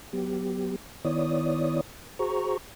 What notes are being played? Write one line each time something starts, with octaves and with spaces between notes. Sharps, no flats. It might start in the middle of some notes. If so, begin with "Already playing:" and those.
F#3 B3 G4
D#3 B3 E4 C#5 D5 D#6
F#4 G#4 C5 A#5 C#6